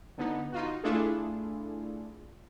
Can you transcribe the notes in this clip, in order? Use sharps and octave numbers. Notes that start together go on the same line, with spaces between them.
D3 B3 D#4
D#4 F4 F#4
A3 D4 E4 F4 G#4 A4